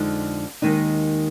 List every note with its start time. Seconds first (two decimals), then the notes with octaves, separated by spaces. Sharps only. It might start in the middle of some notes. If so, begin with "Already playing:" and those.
Already playing: F2 D3 F3 G#3 D#4
0.62 D#2 D#3 G#3 D#4